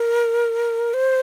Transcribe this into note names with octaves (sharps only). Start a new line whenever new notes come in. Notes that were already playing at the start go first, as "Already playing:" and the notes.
Already playing: A#4
C5